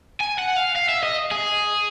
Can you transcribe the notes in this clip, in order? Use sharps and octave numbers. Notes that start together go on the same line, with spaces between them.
G#5
F#5
F5
F5
E5
D#5
G#4